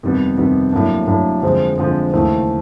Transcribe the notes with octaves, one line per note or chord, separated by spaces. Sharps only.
F2 C3 D#3 G3 B3
F2 C3 D#3 G3 B3
A2 F#3 A#3 D4
A2 F#3 A#3 D4
F2 D3 F3 G#3 C4
F2 D3 F3 G#3 C4
D#2 C#3 E3 A3 C4